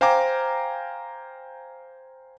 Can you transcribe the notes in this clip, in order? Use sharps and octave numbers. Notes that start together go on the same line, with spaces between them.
C5 F5 G5 G#5 A#5 D6